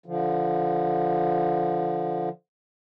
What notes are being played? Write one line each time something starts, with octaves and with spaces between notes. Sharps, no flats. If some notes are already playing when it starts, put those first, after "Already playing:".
D3 F3